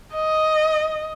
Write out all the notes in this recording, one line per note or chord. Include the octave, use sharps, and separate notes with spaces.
D#5